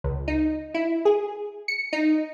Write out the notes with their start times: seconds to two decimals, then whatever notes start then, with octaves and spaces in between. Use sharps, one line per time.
0.04 C#2
0.28 D#4
0.74 E4
1.05 G#4
1.68 C#7
1.93 D#4